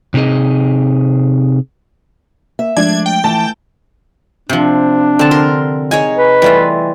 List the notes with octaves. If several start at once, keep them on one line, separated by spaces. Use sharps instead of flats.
C3 C4 D#4 G#4 D#5
A#3 E5
F3 G#3 A3 D4 G#6
G5
E3 A3 A5
C3 F3 D4
D3 C4 A5
A#4 C6
D#4 G#4 C#5 G#5
B4
E3 G3 A3 F4